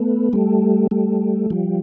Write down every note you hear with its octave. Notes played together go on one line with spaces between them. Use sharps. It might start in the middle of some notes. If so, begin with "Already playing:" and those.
Already playing: A3 B3
G3 A3
G3 A3
F3 G3